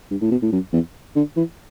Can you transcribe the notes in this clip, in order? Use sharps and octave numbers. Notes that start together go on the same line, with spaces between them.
G2
A2
B2
A2
F#2
E2
D3
E3